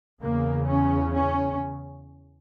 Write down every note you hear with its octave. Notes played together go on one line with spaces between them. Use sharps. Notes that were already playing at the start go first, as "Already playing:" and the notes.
E2 C#3 A#3
C#4
C#4